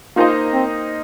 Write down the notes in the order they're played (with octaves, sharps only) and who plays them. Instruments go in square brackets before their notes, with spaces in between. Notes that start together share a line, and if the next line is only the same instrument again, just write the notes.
[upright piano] A#3 D#4 C5 D#5 [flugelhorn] F4
[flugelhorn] C4